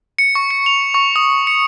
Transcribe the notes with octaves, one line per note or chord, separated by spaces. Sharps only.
C#7
C#6
C#7
F7
C#6
D#6
C#7